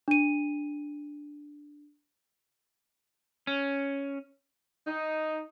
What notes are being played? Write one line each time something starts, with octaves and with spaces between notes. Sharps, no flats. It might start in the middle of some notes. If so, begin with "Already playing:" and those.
D4 D#7
C#4
D#4